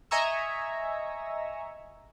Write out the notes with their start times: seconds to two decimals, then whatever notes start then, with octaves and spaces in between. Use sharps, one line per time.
0.11 D#5 E5 G#5 A#5 C#6 E6